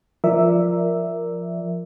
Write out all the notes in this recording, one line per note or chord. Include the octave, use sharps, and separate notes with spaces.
F3 A#4 D5 E5